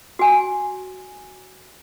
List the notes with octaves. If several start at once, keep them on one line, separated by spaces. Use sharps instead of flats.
F#4 G#5